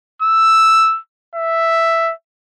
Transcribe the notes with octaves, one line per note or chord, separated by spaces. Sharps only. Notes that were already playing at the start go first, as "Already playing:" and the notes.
E6
E5